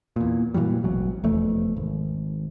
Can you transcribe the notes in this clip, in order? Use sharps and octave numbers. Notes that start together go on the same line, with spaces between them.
E2 A#2
A#2 E3 F#3 G3
E1 A1 F#3
F1 E2 A3
G#1